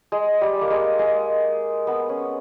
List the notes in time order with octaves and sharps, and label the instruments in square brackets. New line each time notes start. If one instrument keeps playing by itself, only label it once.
[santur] G#3
G3
A#3
G#3
G#3
B3
C#4